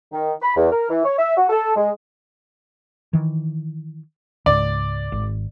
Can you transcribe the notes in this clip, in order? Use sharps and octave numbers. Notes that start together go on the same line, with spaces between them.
D#3
B5
E2
A#4
E3
C#5
E5
F#4
A4
G#3
D#3 E3
C#2 G#2 D5
G#1